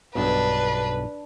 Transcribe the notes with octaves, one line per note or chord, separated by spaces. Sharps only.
B1 G2 B2 D4 B4